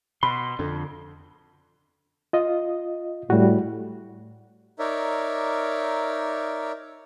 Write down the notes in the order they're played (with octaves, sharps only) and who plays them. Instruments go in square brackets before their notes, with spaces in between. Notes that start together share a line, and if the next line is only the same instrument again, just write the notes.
[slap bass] B2 [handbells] B5 [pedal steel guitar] C6
[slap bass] F2 [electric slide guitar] D3
[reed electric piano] F4 D#5
[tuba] A2 [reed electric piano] G3 F#4
[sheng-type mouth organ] D#4 A#4 C#5 D5 E5